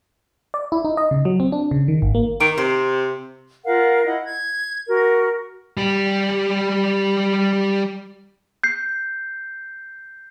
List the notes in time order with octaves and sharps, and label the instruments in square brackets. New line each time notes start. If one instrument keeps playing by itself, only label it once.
[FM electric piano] D5
E4
D#4
D#5
C#3
F#3
C4
D4
C#3
D#3
G#1
A#3
[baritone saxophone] D#3 [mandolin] D6
[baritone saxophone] C3 [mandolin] C5
[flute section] F4 A#4 F5 F#5
E4 D#5 F#5
G#6
F#4 A#4
[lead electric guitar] G3 G4
[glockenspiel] G6 C7